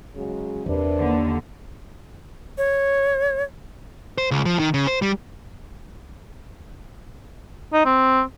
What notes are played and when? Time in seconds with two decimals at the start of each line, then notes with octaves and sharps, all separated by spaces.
0.15 C#3 F#3 G#3
0.66 E2 C3 D4 A#4 B4
0.99 D#2 D3
2.58 C#5
4.18 C5
4.31 C#2
4.45 F3
4.59 D#3
4.74 C#3
4.87 C5
5.02 G3
7.73 D#4
7.85 C4